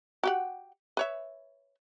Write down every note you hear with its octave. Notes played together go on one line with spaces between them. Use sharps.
F#4 G4 F#5
B4 C#5 E5